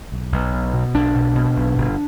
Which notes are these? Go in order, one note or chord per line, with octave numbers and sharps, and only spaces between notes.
B1
B1
B2
B2
B1 D4
B2
B2
B1
G1